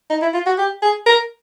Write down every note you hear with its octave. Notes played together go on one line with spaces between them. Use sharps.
D#4
E4
F4
F#4
G4
G#4
A#4